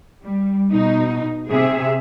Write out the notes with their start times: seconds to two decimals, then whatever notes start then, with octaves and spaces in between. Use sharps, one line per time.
0.23 G3
0.71 B2 D#4
1.51 C3 G#4 E5